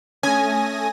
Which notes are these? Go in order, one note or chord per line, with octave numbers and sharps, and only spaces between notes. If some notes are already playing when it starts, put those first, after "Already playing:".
A3 C#4 G#5 D#6 A#6